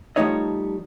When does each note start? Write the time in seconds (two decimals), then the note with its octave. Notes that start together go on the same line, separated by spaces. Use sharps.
0.16 F3 G3 A3 D#4 C#5 D#5